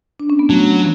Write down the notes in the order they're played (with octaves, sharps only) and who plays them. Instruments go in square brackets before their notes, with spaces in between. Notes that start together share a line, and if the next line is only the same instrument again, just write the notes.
[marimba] D4
C#4
B3
[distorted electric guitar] F#3 [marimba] A3